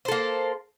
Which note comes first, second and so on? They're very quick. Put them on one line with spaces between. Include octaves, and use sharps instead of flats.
C5 A4 A#3